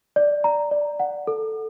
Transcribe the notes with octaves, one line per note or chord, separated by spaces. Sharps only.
D5
A#5
D5
F#5
A4